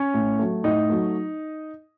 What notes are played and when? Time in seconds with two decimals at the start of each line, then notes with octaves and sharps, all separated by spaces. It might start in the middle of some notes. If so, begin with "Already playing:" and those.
Already playing: C#4 C#5
0.14 A2
0.39 F#3 A3
0.64 A2 D#4 D#5
0.89 F#3 A3